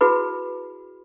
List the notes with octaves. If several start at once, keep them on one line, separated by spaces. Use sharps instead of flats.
E4 F#4 G#4 B4 B5